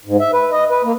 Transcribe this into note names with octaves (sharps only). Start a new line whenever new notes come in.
G#2
E5
B4
D#5
B4
A#3